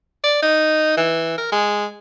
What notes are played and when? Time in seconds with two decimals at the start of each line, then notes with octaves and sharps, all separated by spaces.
0.24 D5
0.42 D#4
0.97 E3
1.38 A#4
1.52 G#3